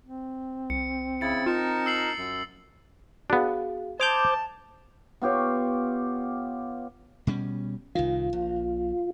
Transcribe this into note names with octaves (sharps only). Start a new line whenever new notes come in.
C4
C2 C#7
C#3 E4 A6 C#7
D#4 F4 A#4 A5
E6 C7 F#7
F#2
B3 D4 F#4 G#4 F5
C5 A5 D6 D#6 G6 G#6 F7
B3 F4 G4 C#5
B2 G3 C#4
C2 D#3 F4
A#1